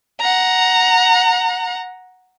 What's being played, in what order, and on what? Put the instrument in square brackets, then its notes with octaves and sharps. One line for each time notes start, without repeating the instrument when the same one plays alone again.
[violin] F#5 A#5